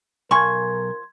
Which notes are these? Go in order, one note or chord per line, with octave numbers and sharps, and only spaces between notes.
B1 F3 A#4 G#5 C6 C#6 G#6